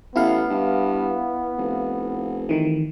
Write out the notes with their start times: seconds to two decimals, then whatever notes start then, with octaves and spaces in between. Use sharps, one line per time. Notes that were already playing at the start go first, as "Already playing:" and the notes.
0.16 A1 B3 E4 F5
0.50 G2
1.58 F1
2.49 D#3 E3